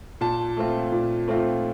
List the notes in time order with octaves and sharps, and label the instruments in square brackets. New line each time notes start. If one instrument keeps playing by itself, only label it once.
[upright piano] A#2 A5
A3 C4 F4
A#2
A3 C4 F4